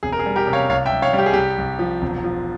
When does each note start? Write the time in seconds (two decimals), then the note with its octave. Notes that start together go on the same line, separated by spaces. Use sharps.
0.03 E1 G#4
0.12 A#4
0.19 G#4
0.26 G3
0.36 G4 A#4
0.47 C3
0.53 C#5 F5
0.69 C2 C#5 F5
0.86 E5 G5
0.91 C2
1.02 C#5 F5
1.13 G3
1.18 G4
1.26 G#4
1.33 C2 G4
1.58 C2
1.79 F3
2.02 E1
2.24 F3